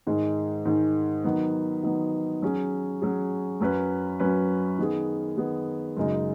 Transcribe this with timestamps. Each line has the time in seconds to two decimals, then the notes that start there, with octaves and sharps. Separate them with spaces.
0.07 G#2 D#3 G#3
0.65 G#2 D#3 G#3
1.24 D#3 F#3 B3
1.83 D#3 F#3 B3
2.42 F#3 C#4 G#4
3.02 F#3 C#4 G#4
3.60 F#2 F#3 C#4 B4
4.20 F#2 F#3 C#4 B4
4.79 D#3 B3 G#4
5.37 D#3 B3 G#4
5.97 F#2 C#3 G#3 D#4